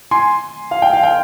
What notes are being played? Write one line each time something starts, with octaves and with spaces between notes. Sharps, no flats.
G#5 C6
F5
G5
F5
G5